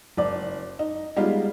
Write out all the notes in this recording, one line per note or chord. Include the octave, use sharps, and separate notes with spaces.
F#1 D5
D#4
G3 G#3 B3 D#4 F4